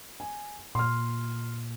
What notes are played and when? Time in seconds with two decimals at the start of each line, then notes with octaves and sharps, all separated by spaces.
0.20 G#5
0.75 A#2 C6 F6